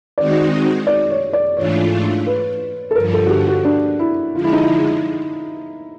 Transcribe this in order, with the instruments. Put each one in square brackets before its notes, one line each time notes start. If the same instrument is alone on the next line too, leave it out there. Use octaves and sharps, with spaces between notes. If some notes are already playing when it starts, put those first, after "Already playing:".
[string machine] D#3 G#3 C4 D#4 F#4 [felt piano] D5
[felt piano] D5
C#5
D5
[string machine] G#2 E3 A3 D4 F4 [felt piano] C#5
[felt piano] B4
A4
[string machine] G2 D3 F3 [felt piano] A#4
[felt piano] A4
F#4
G4
F#4
D4
E4
[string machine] D3 F3 G#3 [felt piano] F4
[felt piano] E4
D#4
E4